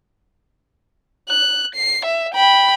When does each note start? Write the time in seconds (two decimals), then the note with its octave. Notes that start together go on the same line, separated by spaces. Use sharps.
1.29 F#6
1.75 C7
2.05 E5
2.34 G5 B5